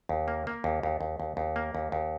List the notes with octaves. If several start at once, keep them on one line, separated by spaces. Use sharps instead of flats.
D#2
A#3
A#3
D#2
D#2
D#2
D#2
D#2
A#3
D#2
D#2